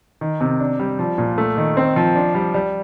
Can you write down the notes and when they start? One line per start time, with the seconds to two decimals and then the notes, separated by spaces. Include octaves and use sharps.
0.21 D#3
0.41 C3
0.60 D4
0.79 G3
0.99 F3
1.18 A#2
1.38 A3
1.57 D#3
1.77 C4
1.96 F3
2.16 D4
2.35 G3
2.54 G3